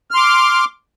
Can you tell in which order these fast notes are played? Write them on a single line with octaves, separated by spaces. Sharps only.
F6 C6 D6